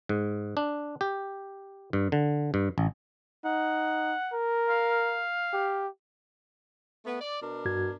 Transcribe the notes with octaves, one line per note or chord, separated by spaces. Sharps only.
G#2
D4
G4
G2
D3
G2
A1
D#4 F#5
A#4
F5
G4
A3 B3
D5
B2 D4 A#4
G2 F#4 G#6